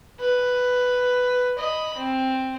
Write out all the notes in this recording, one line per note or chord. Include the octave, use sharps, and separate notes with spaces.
B4
D#5 B5
C4